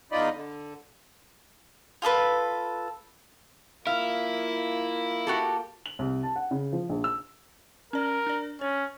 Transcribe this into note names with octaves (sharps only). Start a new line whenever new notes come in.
E2 D#4 F4 D5 D#5 B5
D3
F4 G#4 A4 B4
A#3 E4 F4 F5
F#4 G4 A4
F#7
C2
A5
F#5
C#3
F3
A#1
E6
C#4 A#4 D5
D4 D5
C#4 C#5